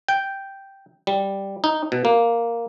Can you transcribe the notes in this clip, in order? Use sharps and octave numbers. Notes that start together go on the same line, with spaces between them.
G5
G3
D#4
B2
A#3